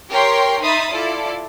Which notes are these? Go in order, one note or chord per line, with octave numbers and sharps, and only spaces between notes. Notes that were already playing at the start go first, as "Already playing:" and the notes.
G4 A#4 C#5 G5 C6
D#4 E5 B5 C6 D#6 A6
E4 F4 A4 D5